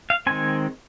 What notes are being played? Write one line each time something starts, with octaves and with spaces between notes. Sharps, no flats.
F5
D#3 G#3 C4 G#5